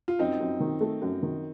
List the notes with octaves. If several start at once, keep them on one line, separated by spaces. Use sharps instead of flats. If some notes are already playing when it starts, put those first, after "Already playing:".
F4
F#2 C4 D#4
F#2
D#3
A3
F#2
D#3